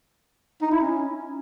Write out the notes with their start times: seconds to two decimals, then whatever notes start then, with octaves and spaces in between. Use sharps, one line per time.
0.62 D#4
0.72 E4
0.81 C#4